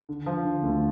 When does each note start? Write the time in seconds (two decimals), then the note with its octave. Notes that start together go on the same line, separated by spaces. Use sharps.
0.09 D3
0.26 F3
0.45 D3
0.63 D2